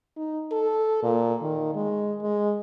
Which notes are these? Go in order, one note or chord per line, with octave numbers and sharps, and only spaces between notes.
D#4
A4
A#2
D#3
G#3
G#3